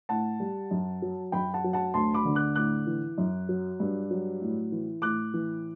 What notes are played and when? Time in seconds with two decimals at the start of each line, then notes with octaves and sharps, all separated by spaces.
0.09 A2 F#5 A5
0.40 G3
0.71 F#2
1.02 F#3
1.32 F#2 G5 B5
1.54 F#5 A5
1.64 F#3
1.73 F#5 A5
1.94 D2 A5 C6
2.14 B5 D6
2.25 D3
2.35 D6 F#6
2.56 A2 D6 F#6
2.87 E3
3.18 F#2
3.49 F#3
3.80 G2
4.11 F#3
4.41 A2
4.72 E3
5.02 A2 D6 F#6
5.34 E3